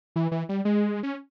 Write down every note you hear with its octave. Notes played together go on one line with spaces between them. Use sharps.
E3
E3
G3
G#3
C#4